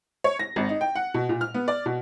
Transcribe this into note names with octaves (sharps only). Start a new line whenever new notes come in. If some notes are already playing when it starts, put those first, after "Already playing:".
C#5
A#6
G#1
D#4
G5
F#5
B2
A#2
F6
B3
D5
B2